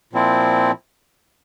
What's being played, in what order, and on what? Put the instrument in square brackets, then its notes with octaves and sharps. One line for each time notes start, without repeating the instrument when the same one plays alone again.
[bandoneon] A#2 F3 C4 E4